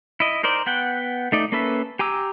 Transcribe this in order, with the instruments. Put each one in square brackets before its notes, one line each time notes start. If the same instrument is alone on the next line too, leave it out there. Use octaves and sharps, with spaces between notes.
[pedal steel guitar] E4 D#5
D#4 A#4 C5 D5
B3 F#5 G5
A3 D#4 D5
A#3 C#4 A4 B4 E5
G4 G#5 A#5 D6 E6